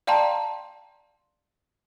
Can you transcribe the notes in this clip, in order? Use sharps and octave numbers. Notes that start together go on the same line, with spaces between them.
D5 F5 G5 A5 A#5 C6